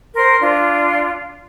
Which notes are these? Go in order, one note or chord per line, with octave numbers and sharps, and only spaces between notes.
A#4 C5 C6
D4 F4